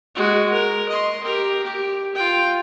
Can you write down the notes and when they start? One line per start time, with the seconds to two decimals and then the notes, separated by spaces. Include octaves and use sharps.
0.15 G#3 F#4
0.51 A#4
0.88 D#5 C6
1.23 G4 A#4
1.63 G4
2.15 F4 G5